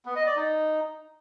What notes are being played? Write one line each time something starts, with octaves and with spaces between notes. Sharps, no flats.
B3
D#5
D5
D#4